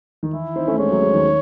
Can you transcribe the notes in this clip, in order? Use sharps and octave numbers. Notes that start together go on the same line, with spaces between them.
D#3
E3 E4
C4 D#4
A3 C#4
G#3 C4 C#5
F#3 A3
G#3 C4
D#3